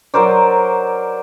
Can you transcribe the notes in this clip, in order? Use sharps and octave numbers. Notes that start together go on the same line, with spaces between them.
F#3 A#4 C5 D5